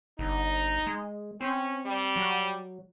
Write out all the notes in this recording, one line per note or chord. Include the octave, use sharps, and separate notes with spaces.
G1 D#4
G#3
C4 C#4
G3
F#3